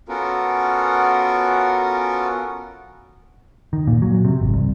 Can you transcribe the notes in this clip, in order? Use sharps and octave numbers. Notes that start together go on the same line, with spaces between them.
B3 C#4 F4 F#4 A4 A#4
D#3
A#2
F#3
C3
G#1
C2